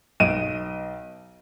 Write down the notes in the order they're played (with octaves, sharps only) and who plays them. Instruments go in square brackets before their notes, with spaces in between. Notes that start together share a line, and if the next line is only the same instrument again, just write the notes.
[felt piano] B1 D#5 D7 D#7